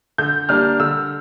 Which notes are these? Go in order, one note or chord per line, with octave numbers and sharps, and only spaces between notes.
D3 G6
G3 A#3 D4 F6
D3 E6